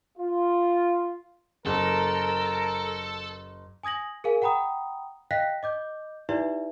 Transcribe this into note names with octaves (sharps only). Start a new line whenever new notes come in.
F4
F#1 A4 A#4
G#5 D#6 G#6 A#6 F#7
G#4 A#4 F5 G#5
F#5 G5 A#5 B5 D#6
D#5 F5 G5 F#6 A#6 B6
D#5 D6 G6
D#4 E4 G4 B4 D5 E5